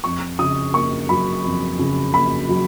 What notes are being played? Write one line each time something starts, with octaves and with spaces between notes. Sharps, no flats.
F2 C#6
C#3 D#6
A#3 C#6
F#3 B5
F2
C#3
A#3 B5
F#3